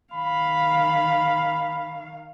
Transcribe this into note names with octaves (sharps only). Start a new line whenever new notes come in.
D#3 F5 B5